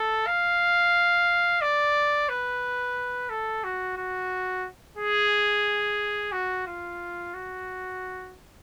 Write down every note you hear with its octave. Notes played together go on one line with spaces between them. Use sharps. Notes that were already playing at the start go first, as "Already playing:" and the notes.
Already playing: A4
F5
D5
B4
A4
F#4
F#4
G#4
F#4
F4
F#4